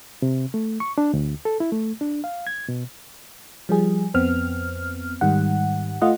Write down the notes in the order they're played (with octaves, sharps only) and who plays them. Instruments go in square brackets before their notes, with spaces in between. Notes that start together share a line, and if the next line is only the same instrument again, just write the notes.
[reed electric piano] C3
A3
C#6
D4
D2
A4
E4
A3
D4
F5
G#6
B2
[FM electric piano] F3 G3 G#4
F2 B3 C4 F6
G#2 D#3 G3 F#5
A3 F4 D#5 F#5